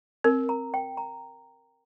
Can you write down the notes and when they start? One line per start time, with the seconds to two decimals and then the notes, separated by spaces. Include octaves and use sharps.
0.24 C4 A#4
0.49 A#5
0.74 G5
0.97 A#5